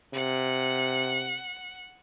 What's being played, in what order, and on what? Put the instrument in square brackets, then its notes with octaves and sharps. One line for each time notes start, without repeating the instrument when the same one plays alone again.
[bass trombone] C3 [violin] F#5